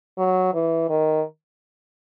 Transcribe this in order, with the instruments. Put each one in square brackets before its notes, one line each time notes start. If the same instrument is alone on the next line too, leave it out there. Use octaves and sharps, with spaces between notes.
[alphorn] F#3
E3
D#3